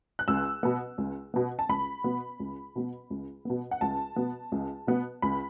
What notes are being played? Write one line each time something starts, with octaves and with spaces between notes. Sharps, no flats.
F#6
C#2 E6
B2 B3
C#2
B2 B3
A5
C#2 B5
B2 B3
C#2
B2 B3
C#2
B2 B3
F#5
C#2 A5
B2 B3
C#2
B2 B3
C#2 B5